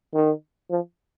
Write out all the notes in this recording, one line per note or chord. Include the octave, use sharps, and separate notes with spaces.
D#3
F3